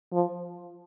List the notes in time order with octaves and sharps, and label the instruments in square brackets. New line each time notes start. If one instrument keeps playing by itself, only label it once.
[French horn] F3